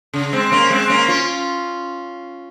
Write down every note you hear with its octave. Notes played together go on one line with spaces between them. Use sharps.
C#3
G#3 C4
A#3 C#4
G#3 C4
A#3 C#4
C#4 F4